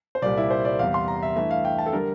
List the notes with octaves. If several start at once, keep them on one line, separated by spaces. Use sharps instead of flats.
C5
C2 A#2 G3 D5
E4
C5
D5
E2 C3 G3 F5
C6
A#5
E5
G2 E3 A3 E5
F5
G5
A5
A4
D3 G3 A#4